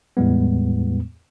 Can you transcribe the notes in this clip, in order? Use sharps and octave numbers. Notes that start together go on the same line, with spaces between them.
E2 A2 G3 G#3 B3